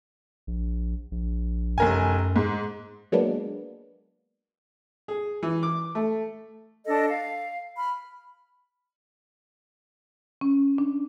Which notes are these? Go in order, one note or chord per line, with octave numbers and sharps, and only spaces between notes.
A#1
A#1
F1 F#2 A#4 G#5
G#2
F#3 G#3 A#3 B3 D4
G#4
E3
D6
A3
D4 A4 D#5
F5
B5 F6
C#4
D4